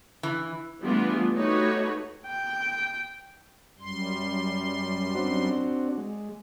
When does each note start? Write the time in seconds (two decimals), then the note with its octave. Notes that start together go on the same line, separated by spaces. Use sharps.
0.23 E3
0.82 E3 G3 A3 B3 D4 F4
1.36 A3 D#4 F#4 G4 B4 C#5
2.27 G5
3.79 F#2 G3 C6
5.15 C4 D4 F#4
5.98 G#3